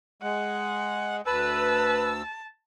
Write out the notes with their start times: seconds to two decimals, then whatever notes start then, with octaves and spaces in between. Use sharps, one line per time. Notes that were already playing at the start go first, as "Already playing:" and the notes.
0.22 G#3 F#5
1.26 D2 B4 A5 E6